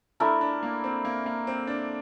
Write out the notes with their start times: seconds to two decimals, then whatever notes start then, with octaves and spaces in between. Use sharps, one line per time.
0.20 A3 D4 E4 A#4
0.41 D4
0.63 A#3
0.84 C4
1.05 A#3
1.26 A#3
1.47 C4
1.67 D4